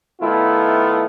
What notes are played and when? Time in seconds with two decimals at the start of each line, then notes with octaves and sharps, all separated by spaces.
0.21 D#3 A3 B3 E4 F4